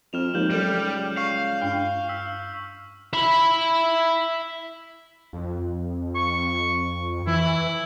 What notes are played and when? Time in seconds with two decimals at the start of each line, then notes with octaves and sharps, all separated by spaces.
0.13 F2 F6 E7 F7
0.34 D#2 F3 G#3 G6 E7 F#7
0.50 C#2 F#3 G3 A4
1.17 F5 C#6 C7
1.61 G2 D4 G5 F6
2.09 E6 B6
3.14 E5 B5
5.33 F2
6.15 C#6
7.27 E3 E4